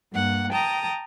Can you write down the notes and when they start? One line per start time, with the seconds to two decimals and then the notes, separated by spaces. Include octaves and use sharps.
0.13 G2 A#3 F#5
0.52 G5 A5 A#5 D#6